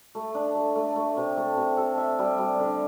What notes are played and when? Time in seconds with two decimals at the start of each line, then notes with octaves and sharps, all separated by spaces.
0.15 A3
0.34 D4
0.55 A3
0.75 A3
0.96 A3
1.17 C3
1.37 A3
1.57 C3
1.77 A4
1.98 E5
2.19 G3
2.39 G3
2.59 D3